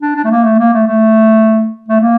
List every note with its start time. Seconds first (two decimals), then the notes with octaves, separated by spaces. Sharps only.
0.02 D4
0.16 D4
0.24 A3
0.31 A#3
0.44 A3
0.59 A#3
0.73 A3
0.87 A3
1.88 A3
2.01 A#3